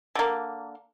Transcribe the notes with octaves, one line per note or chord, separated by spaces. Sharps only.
D3 A#3